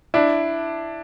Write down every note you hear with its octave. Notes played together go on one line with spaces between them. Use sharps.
D4 E4